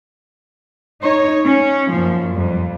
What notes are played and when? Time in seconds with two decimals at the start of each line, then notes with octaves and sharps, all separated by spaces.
1.02 D#4 C#5
1.45 C#4
1.92 F#2 A#2 F3
2.33 F2 G3